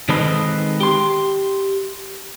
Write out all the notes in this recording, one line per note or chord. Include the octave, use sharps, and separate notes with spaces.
D#3 G#3 C4 A4 B4 D#5
G4 C6